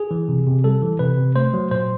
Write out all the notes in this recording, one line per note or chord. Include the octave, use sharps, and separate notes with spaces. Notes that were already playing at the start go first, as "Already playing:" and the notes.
Already playing: G#4
E3
C3
C3
G3 A4
E3
C3 B4
C3
A3 C5
F#3
A#2 C5